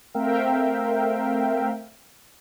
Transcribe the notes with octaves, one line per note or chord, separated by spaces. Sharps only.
A3 C4 A#4 E5 F5 G5